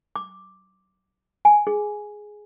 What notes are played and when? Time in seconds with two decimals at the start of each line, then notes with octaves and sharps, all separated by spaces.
0.16 D6
1.45 G#5
1.67 G#4